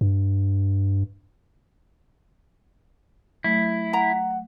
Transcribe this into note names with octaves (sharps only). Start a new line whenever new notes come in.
G2
F#3 A3 E4
F#5 A#5